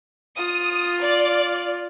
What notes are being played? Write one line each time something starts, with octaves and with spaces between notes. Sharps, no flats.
F4 D#6
D5